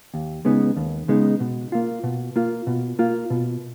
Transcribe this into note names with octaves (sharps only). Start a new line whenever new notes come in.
D#2
C#3 G#3 B3 D#4
D#2
C#3 G#3 B3 D#4
B2
A#3 F4
B2
A#3 F4
B2
A#3 F4
B2